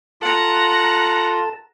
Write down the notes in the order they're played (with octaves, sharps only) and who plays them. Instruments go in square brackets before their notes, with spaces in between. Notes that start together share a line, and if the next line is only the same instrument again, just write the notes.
[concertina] F4 [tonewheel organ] A4 A5 [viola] F#5 A#5